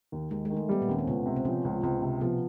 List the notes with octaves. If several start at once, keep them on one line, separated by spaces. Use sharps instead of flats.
D#2
D#2 G#3
G#3
D#3
A3
G3 B3
A#2 A#3
D#2 C#4
C4
C#2 B2 B3
C3
C4
C#3 F3 C#4
C#2
C#2 C3 C4
C3
B2 F3 B3